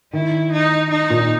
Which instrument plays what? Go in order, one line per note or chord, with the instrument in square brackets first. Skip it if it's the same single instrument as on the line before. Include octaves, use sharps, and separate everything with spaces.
[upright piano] D#3 [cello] E4
[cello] D#4
D#4
[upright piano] A#2